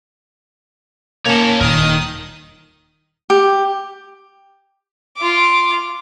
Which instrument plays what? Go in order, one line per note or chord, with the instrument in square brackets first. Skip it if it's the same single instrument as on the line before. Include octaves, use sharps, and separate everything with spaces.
[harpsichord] A#3 [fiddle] C#4 A#4 [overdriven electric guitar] C#5 A5
[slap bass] D#1 A#2 [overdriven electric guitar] D#4 A#4 [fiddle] D#6
[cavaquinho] G4
[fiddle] F4 D6